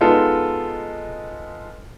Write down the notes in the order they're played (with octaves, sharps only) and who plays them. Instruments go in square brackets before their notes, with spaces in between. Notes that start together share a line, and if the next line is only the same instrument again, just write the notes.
[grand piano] G#3 B3 D#4 F4 A4